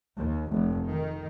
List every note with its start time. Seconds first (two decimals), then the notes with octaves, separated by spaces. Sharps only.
0.17 D#2
0.51 F1
0.89 D#3